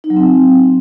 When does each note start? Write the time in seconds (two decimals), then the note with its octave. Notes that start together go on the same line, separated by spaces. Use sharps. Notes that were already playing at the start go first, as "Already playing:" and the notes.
0.04 D#4
0.10 F#3
0.16 C4